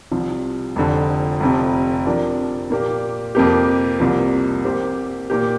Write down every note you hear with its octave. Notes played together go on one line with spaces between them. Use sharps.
C2 C3 F3
F1 F2 D3
F1 F2 C3
C3 F3 D4 A#4 D5
A#2 A#3 G4
F2 C3 A#3 G4
C2 C3 F3 A#3
C3 A#3 G4 C5
A#2 A#3 G4